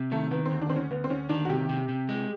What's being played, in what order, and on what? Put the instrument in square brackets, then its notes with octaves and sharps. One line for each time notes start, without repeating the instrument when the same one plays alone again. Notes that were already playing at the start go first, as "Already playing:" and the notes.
Already playing: [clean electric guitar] C3
[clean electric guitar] D#3 [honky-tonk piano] A3
[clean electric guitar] D#3 [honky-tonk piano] B3
[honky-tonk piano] C4
[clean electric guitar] D2
[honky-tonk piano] D4
[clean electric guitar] D2 [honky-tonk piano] C4
[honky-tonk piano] C#4
[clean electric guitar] D2 [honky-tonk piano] B3
[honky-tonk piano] C4
[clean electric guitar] D2 [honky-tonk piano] C#4
[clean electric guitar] D#3 [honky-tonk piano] D4
[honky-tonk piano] F#4
[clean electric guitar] C3 [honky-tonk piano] G4
[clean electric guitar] C3
C3
G#3